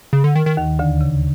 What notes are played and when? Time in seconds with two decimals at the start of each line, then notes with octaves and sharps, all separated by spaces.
0.13 C#3
0.24 D3
0.36 D#3
0.46 D#3
0.57 D#2 D#3
0.79 D2 D3
1.01 C#3